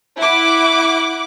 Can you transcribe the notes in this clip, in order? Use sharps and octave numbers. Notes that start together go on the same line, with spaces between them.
E4 F#5 D6